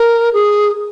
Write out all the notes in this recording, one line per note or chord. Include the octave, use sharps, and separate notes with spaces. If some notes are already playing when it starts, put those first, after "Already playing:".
Already playing: A#4
G#4